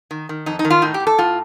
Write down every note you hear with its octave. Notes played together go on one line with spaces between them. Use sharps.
D#3
D#3
F2 D#4
D#4
D#3
F4
A2 D#4
G4
A2
A4
A2 F4